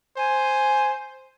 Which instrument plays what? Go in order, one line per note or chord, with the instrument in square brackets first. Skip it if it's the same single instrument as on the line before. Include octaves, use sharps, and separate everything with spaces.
[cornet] C5 [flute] G#5